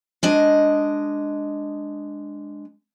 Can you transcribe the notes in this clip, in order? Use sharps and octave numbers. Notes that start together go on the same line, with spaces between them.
G#3 D4 D#5